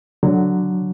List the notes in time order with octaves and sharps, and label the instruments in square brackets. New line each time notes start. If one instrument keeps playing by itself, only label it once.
[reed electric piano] D3 F#3